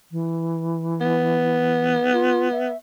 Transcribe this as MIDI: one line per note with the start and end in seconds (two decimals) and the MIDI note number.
0.11 1.97 52
1.01 2.72 59
2.13 2.51 65
2.52 2.77 76